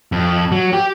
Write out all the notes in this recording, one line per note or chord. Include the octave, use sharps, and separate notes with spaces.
F2
F#3
G4